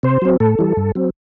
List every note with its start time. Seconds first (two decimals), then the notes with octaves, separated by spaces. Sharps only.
0.03 C3 C5
0.22 F#3 C4
0.40 A2 A4
0.59 E3 G3
0.77 G2
0.95 F#3 C4